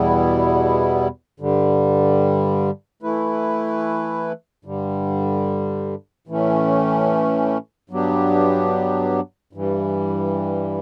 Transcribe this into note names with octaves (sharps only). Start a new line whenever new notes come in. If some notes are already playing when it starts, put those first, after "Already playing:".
Already playing: E2 B2 G3 B3 E4
G2 D3 G3
E3 A3 E4 B4
G2 D3 G3
A2 E3 A3 C#4
G2 F#3 B3 D4 G4
G2 E3 G3